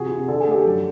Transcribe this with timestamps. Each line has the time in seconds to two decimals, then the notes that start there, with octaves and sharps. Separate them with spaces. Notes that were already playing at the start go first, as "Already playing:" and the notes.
Already playing: C3 F3 F#4 G#4
0.11 C3
0.28 D3 A4
0.40 G#4
0.47 A3 G4 A4
0.65 F#2